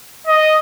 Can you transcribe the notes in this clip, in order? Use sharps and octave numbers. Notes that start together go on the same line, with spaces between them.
D#5